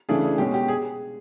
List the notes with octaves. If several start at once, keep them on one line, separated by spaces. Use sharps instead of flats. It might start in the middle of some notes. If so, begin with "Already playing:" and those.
C#3 E3 A3 D4 G#4
G#4
B2 G#3 C#4 G4
G4
G#4